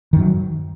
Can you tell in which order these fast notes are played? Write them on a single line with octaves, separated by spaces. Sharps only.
D#3 F#2 F#3